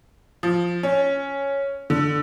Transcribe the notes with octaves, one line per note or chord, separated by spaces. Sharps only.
F3
C#4
D3